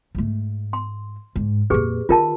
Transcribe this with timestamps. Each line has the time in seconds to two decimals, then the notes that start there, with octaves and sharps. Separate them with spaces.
0.15 G#2 A3
0.73 C6
1.36 G#2
1.70 F2 A#2 G4 G#4 B4
2.09 D#3 F4 A#4 A5